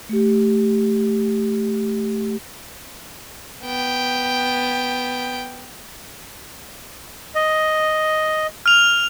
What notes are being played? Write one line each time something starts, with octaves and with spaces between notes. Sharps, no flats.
A3 G4
B3 G5
D#5
F6 F7